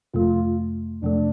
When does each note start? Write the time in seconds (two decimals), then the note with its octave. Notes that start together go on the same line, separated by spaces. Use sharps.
0.14 F2 C3 A3 F4
1.03 F2 C3 A3 D4